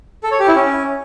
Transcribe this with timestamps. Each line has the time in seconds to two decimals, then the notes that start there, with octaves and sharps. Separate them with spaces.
0.23 A4
0.31 C#5
0.40 G4
0.48 E4
0.56 C#4